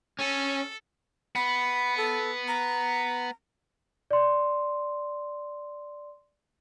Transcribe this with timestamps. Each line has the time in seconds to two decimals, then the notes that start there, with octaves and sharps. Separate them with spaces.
0.19 C#4 A4
1.36 B3 B5
1.98 A4
2.48 A#5
4.11 D5 C6